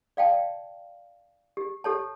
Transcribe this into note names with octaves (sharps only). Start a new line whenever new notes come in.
D5 F5 G5 A5
G4
G4 A4 C#5 A5